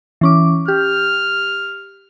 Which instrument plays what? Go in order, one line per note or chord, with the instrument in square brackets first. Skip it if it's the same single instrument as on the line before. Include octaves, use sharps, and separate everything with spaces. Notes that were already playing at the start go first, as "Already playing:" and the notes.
[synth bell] E3 C#4 D6
[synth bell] G4 [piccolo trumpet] F6